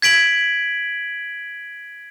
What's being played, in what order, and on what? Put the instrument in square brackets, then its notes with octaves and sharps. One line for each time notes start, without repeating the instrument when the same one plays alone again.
[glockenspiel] G#6 B6 D7 F#7